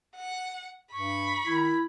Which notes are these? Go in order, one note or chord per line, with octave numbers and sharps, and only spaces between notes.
F#5
G2 B5 C#6
D#3 E4